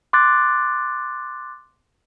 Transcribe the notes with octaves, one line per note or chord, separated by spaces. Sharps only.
C6 D6 F#6 A6